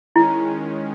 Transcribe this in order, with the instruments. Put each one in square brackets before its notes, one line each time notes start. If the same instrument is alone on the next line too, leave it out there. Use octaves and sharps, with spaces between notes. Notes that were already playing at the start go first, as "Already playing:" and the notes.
[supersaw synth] D#3 G#3 C#4 [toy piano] E4